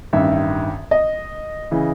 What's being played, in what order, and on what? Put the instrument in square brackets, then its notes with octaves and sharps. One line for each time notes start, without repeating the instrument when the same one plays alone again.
[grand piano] A1 G2 D#3 E5
D#5
C#3 E3